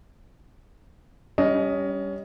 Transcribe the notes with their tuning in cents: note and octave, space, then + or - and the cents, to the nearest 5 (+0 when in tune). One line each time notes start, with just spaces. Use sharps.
G3 +0 C#4 +20 D#5 +0